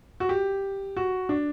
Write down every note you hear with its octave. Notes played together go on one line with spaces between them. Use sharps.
F#4
G4
F#4
D4